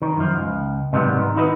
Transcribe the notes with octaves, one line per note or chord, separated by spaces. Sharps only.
D#3
F#2 F3
C#2
G#2 C3 D#3 F#3 G3 B3
D#3
D#4 E4 F#4 B4